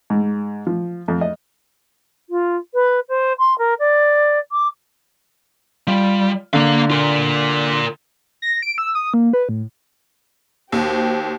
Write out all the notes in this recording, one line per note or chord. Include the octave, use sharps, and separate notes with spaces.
G#2
F3
F2
D#5
F4
B4
C5
C6
A#4
D5
D6
G3 F4
D3 A#3 F5
F4 A#4
A#6
D7
E6
D#6
A#3
B4
A2
D#2 F#4 G4 C5